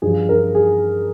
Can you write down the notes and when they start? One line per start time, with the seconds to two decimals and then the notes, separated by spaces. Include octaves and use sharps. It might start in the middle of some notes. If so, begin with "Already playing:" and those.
0.02 G2 F3 G#4
0.29 A#4
0.55 G#4